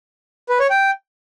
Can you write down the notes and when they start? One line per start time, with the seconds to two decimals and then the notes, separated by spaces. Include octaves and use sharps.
0.49 B4
0.60 C#5
0.70 G5